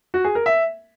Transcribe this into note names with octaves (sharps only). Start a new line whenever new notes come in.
F#4
G#4
A#4
E5